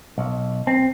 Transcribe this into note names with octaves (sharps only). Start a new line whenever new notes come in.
B1
C4